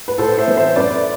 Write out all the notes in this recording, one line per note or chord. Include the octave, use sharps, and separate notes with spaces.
B4
A2 A4 C5
C5 E5
E3 B3
C5 E5
F#2 B4 D5